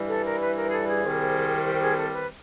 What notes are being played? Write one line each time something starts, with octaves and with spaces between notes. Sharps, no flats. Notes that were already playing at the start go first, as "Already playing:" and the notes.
Already playing: G2 E3 G3
A4
A#4
B4
A#4
G#4
A4
G#4
C2 C3 D#3 G3
G4
G#4
A4
B4